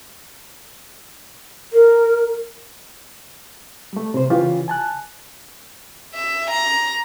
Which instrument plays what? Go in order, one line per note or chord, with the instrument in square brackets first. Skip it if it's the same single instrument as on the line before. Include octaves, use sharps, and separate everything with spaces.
[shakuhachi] A#4
[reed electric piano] G3 A3
C3 C5
C#3 E3 C#4 F4 G4
G#5 A5 F#6
[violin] E5
A#5